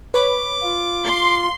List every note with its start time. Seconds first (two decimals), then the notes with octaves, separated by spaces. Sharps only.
0.14 B4 C#5 B5 D6
0.63 F4
1.06 C6